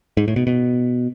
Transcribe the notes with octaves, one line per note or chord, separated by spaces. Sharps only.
G#2
A2
B2
B2